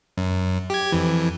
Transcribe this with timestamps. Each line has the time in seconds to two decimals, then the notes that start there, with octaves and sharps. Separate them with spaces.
0.17 F#2
0.70 G4 G#6
0.92 F2 E3